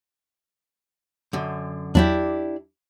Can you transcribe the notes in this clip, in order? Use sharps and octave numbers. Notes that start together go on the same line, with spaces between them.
F#2 D3
E2 F#3 D4 E4 G4